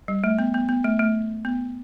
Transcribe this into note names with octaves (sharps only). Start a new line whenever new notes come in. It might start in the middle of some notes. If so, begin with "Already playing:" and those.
G3
A3
B3
B3
B3
A3
A3
B3